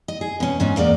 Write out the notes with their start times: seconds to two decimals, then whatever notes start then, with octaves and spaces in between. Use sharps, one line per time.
0.08 D#5
0.21 G#4
0.40 B2 C#4
0.60 G#2 C#4
0.76 E2 A#3 D#4 D5